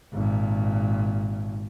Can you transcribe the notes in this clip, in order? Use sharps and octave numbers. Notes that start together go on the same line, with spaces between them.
G#1 A#2